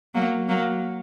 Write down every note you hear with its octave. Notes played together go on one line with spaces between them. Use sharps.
F#3 A#3
F#3 A#3